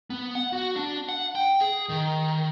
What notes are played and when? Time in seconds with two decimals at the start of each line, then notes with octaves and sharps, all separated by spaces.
0.10 B3
0.35 F#5
0.53 F#4
0.76 D4
1.08 F#5
1.35 G5
1.61 G#4
1.89 D#3